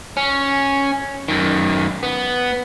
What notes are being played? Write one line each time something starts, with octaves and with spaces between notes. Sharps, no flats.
C#4
F#2 D#3
B3